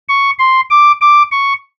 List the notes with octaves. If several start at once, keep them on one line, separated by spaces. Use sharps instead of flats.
C#6
C6
D6
D6
C#6